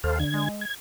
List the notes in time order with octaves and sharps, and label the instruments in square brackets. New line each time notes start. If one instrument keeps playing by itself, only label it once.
[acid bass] D#2 [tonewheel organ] A4 C5 F5
[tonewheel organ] D3 G#6
[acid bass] G#3
[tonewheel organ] G#6